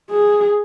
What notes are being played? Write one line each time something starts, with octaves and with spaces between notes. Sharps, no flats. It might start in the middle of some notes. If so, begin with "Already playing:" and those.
G#4